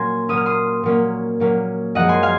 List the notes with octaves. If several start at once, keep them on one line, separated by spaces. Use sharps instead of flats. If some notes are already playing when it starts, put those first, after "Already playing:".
Already playing: A#2 F#3 A#3 C#4 G#5 A#5 C6
A#2 F#3 A#3 C#4 D#6
F6
C6 D#6
A#2 F#3 A#3 C#4
A#2 F#3 A#3 C#4
F#2 F3 G#3 D#5 F#5
G#5 C6
F5 G#5